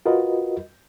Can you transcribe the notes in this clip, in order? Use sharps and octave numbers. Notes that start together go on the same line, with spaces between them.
F4 F#4 A#4 B4 D#5